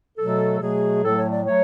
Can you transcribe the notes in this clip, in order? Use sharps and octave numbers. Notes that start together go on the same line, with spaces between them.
B2 F#3 A3 A4
B2 F#3 A3 G#4
A2 F#3 A3 A4
C#5
D5
F#3 A3 C#5